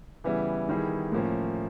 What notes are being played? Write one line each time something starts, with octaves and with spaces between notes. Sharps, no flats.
C#3 E3 G3 B3 E4
D#3 G3 B3 E4 G#4
A2 F3 A#3 C#4